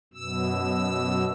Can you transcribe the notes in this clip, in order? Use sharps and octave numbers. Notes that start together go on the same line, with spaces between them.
F#2 B2 E6